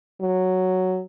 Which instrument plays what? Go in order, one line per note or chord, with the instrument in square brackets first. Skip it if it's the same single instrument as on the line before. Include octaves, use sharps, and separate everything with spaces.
[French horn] F#3